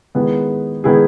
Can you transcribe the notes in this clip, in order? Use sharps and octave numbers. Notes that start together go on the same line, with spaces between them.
D#3 G#3 B3 E4 G#4
D#3 G#3 B3 E4 G#4